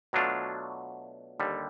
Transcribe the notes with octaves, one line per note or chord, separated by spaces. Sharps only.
B2 F#3 A3 D4 F4
D#2 D3 G3